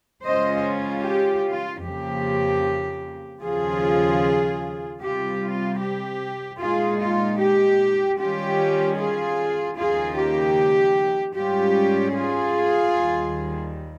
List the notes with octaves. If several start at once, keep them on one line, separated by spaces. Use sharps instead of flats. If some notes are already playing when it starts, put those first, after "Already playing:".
C#3 G#3 C#4 F4 C5 D#5
G4
F4
F2 C#3 F3 A#3 G4
D#2 C#3 F3 F4 G#4
C3 G3 C4 F4 G4
F4
G4
A#2 G#3 D#4 F4 G#4
F4
G4
D#3 G3 C#4 F4 G4
F4 G#4
D#2 C#3 F3 A#3 D#4 F4 G#4
G4
G#2 G3 C#4 F4 G4
F4 G#4
D#2 D#3 G3